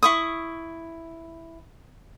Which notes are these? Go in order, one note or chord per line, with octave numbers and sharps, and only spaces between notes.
E4 C#6 D#6